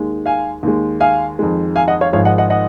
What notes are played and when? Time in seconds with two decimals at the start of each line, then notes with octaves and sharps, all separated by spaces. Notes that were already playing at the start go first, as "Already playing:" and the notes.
Already playing: D#2 D#3 G#3
0.26 F5 G#5
0.63 D#2 D#3 G#3
1.00 F5 G#5
1.39 F2 D#3 G#3
1.76 F5 G#5
1.88 D#5 F#5
2.01 C#5 F5
2.13 G#1 G#2 F3 G#3 C#5 F5
2.25 D#5 F#5
2.38 D#5 F#5
2.50 D#5 F#5